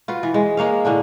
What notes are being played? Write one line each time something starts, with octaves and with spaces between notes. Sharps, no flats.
F4 F#4 B4
E3
G#3
G#3 A#3 C#5 F5
A2 D3 C#4 D4